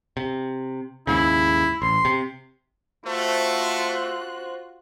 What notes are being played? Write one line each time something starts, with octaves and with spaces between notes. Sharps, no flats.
C3
D#2 G#2 C#3 E4
A1 C6
C3
A3 F4 F#4 C5 F#6